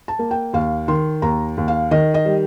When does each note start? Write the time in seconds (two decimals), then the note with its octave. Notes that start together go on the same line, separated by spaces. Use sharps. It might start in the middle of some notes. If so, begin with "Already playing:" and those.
0.08 A5
0.19 A#3
0.31 G5
0.53 D#2 F5
0.88 D#3 C6
1.22 D#2 A#5
1.57 D#2
1.68 F5
1.91 D#3 D#5
2.14 D#5
2.25 G3